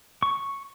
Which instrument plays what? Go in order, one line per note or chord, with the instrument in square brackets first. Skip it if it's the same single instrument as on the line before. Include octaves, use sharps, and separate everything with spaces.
[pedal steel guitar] C#6